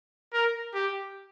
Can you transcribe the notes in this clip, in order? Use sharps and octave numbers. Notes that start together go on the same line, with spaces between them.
A#4
G4